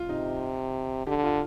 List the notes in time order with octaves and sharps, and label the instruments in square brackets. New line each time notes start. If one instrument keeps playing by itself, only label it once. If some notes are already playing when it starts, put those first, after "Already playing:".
Already playing: [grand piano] F4
[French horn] C3 [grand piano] D#4
[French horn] D3 [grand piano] G4
[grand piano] F4